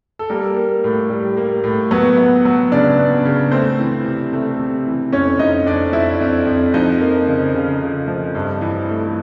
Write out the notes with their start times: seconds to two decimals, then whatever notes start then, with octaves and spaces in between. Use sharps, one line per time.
0.19 A4
0.30 G3 A#3 A#4
0.57 A#3
0.84 A2
1.10 G3
1.37 A#3
1.64 A2
1.91 F#3 B3 B4
2.17 B3
2.45 F#3
2.72 C#3 D4 D5
2.99 B3
3.25 C#3
3.51 A3 C4 C5
3.79 E3
4.05 C3
4.33 A3
4.59 C3
4.87 E3
5.13 F2 C#4 C#5
5.39 F2 D#4 D#5
5.66 F2 D4 D5
5.93 F2 E4 E5
6.21 F2
6.47 F2
6.74 F3 D#4 D#5
7.01 A#3
7.27 C#3
7.54 C#3
7.82 C#3
8.08 F3
8.35 G2
8.61 E3
8.88 A3